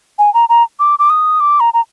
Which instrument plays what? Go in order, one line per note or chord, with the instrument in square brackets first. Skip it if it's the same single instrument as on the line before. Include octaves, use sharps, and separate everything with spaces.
[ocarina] G#5
A#5
A#5
D6
D6
D#6
D6
A#5
A#5